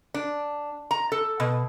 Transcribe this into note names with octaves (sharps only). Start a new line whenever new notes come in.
D4
A#5
A4
B2